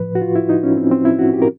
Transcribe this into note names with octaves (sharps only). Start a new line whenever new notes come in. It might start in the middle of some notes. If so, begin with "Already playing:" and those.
Already playing: A2 F3 B4
F#4
F4
E4
D#4
C#4
C4
C4
E4
F#4
G4
A#4